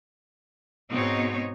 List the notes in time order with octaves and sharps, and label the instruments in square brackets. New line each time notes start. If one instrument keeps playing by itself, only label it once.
[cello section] G#2 B2 C4 D#4 C#5